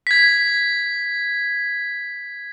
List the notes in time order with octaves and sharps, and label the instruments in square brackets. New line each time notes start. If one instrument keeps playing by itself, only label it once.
[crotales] G#6 B6